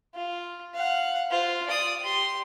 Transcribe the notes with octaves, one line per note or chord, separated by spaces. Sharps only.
F4
F5 F#5
F4 C5
D5 D#6
G4 C6